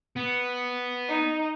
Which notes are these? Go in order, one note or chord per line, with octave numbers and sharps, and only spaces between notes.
B3
D#4